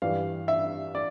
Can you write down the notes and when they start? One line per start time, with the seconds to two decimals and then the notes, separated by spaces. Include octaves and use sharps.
0.02 G2 E3 G3 F5
0.48 E5
0.95 D5